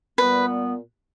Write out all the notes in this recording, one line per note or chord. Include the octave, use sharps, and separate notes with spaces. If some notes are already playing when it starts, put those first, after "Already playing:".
A#2 G3 B3 B4